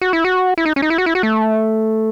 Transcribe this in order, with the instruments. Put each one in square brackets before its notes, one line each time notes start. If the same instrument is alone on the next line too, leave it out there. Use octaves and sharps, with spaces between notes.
[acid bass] F#4
E4
F#4
E4
D#4
C#4
D#4
E4
F#4
E4
F#4
A3